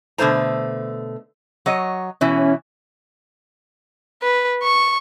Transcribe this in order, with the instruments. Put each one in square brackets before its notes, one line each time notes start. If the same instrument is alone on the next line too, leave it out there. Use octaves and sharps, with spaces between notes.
[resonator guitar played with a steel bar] B2 D3 A3 C5 A#5
F#3 C#5 D#5
[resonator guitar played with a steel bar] B2 E3 E4 [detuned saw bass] C#4
[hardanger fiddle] B4
C#6